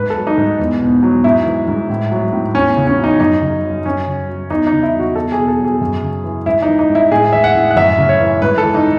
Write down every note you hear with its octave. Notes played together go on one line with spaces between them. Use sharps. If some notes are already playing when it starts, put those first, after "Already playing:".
Already playing: G#2 B4
A4
F#3
D#4
G#2
E2
B2
F#3
G#2 E4
E3
G#2
A2
F#3
A2
E2 C#4
C#3
C#4
F#3
D#4
F#2 D#4
C#3
F#3
F#2 C#4
C#3
F#3
E2 D#4
D#4
C#3
E4
F#3
F#4
E2 A4
G#4
B2
A4
F#3
G#4
F#2
C#3
E3
G#2 E4
D#4
E3
D#4
G#2
E4
A2 G#4
E3 E5
F#5
A2
F#5
F#2 E5
C#3
C#5
E3
G#2 B4
A4
E3
D#4